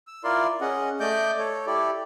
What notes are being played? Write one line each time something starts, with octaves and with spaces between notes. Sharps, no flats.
E6
E4 F4 A#4 D5 C6
C#4 G#4 D#5 F#5
A3 D5 D#5 D6 G6
A4 C#5
E4 G4 A4 D5